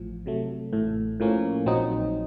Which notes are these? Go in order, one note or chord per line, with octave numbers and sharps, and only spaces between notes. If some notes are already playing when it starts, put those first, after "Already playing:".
Already playing: A1 A2 F3
C3 F#3 A3
A1 A2 A3
A2 F3 A#3 C#4
A#1 A#2 F#3 C4 D#4